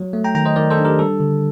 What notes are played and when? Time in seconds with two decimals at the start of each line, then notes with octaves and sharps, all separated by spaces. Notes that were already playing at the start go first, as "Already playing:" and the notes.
Already playing: F#3
0.13 A3
0.24 G5 A#5
0.35 D#3 G5 A#5
0.45 C5 D#5
0.56 D#3 A#4 D5
0.70 A4 C5
0.77 D4
0.85 G4 A#4
0.99 G3 A4
1.20 D3